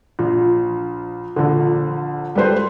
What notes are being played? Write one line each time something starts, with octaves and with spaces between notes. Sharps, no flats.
A#1
A#1 D3
G3 A4 B4 C5